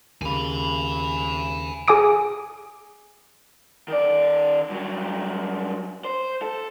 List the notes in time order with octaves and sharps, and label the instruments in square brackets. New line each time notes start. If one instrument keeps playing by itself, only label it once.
[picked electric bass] D#2 C#3 [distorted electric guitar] G#5 B5
[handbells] G#4 G#5 D6 D#6 D7
[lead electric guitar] D#3 D5
G2 F#3
C5
A4